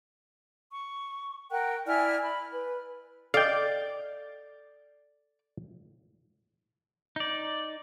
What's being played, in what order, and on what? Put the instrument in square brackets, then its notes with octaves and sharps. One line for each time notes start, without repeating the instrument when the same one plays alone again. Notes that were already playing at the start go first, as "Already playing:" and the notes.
[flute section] C#6
A#4 F#5 G5 F#6
E4 D5 G#5 F6
B5
B4
[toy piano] A4 D#5 [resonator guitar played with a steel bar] D5 [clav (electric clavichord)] F5 G5
[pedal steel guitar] D#4 D5